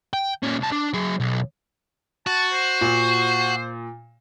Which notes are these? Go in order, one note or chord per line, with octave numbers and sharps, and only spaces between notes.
G5
A#2 C#4
C2 A5
D4
F#3 G#4
B1
F#4 A5
C5
A#2